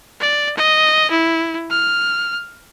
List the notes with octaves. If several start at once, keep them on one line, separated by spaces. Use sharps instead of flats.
D5
D#5
E4
F6